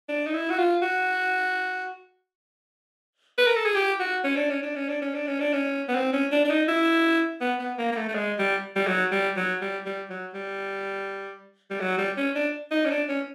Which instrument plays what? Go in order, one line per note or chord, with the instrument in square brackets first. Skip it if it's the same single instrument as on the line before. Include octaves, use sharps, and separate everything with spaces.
[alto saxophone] D4
D#4
E4
F#4
F4
F#4
B4
A#4
A4
G#4
G4
F#4
C#4
D4
C#4
D4
C#4
D4
C#4
D4
C#4
D4
C#4
B3
C4
C#4
D4
D4
D#4
E4
B3
B3
A#3
A#3
A3
A3
G#3
G3
G3
F#3
G3
F#3
G3
G3
F#3
G3
G3
F#3
G3
C#4
D4
D#4
C#4
D4
C#4